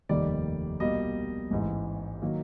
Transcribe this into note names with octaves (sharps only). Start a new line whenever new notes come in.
F1 D#2 D#3 G3 D5
C2 B2 G3 A#3 D#5
A1 G#2 E3
D#3 F#3 A#3